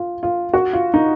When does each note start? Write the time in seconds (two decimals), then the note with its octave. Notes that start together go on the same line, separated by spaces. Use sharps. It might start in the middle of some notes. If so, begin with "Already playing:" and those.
Already playing: F4
0.23 F4
0.54 F#4
0.73 F4
0.94 D#4